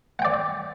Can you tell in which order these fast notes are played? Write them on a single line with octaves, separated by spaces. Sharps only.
F#5 G5 D5